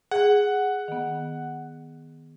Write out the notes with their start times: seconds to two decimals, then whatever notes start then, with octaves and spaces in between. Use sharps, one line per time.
0.11 G#4 F#5
0.88 D#3 B3